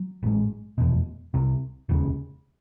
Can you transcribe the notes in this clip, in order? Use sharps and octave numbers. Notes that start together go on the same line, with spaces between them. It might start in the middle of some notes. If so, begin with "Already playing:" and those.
Already playing: F#3
A1 G#2
F1 E2 B2
C2 C3
E1 D#2 C#3